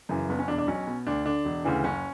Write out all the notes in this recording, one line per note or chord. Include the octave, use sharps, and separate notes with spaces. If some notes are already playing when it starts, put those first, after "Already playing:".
F#2 C#3 E3
F#1 B3
C#4
E2 B2 D4
D4
B1 C#4
B2
D2 D4
D3 D4
E1
D2 C#3 E3
F#1 C#4